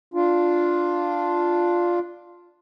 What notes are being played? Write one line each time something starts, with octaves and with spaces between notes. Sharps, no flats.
D4 F4